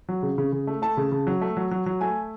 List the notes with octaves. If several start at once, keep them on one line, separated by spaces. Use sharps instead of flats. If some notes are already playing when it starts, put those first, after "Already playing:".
F#3
C#3
C#3
C#3
A3
A3 A5
C#3
C#3
F#3
A3
F#3
F#3
F#3
A3 G#5